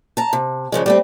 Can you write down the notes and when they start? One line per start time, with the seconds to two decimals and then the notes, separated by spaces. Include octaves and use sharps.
0.17 A5 A#5
0.33 C3
0.72 G2 C#3 F3 G#3
0.86 G3 A3 C4